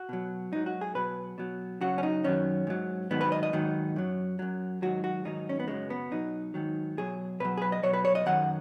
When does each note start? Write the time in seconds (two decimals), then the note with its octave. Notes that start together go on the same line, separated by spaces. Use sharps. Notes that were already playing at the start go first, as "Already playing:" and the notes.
Already playing: F#4
0.09 B2 F#3
0.52 G#2 F#3 D#4
0.66 F#4
0.81 G#4
0.95 B2 F#3 B4
1.38 B2 F#3
1.81 F#2 C#3 F#3 F#4
1.98 C#4
2.03 D#4
2.24 F#2 D#3 F#3 C#4
2.67 G#2 F#3
3.11 G#2 D#3 F#3 B3
3.21 B4
3.32 D#5
3.43 D#5
3.53 G#2 D#3 F#3
3.96 F#2 F#3
4.39 F#2 F#3
4.82 G#2 D#3 F#3 F#4
5.04 F#4
5.25 G#2 D#3 F#3 D#4
5.49 C#4
5.60 B3
5.68 F#2 C#3 F#3 G#3
5.90 B3
6.11 B2 F#3 D#4
6.54 G#2 D#3 F#3
6.97 B2 F#3 G#4
7.40 B2 F#3 B4
7.57 G#4
7.62 B4
7.72 D#5
7.83 B2 F#3 C#5
7.93 B4
8.05 C#5
8.15 D#5
8.26 F#2 D#3 F#3 F#5